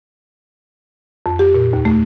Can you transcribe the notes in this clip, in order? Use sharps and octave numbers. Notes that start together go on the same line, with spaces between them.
F2
G4
A#2
D#2
A3